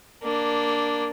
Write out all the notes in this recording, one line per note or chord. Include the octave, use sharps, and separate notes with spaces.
A#3 D4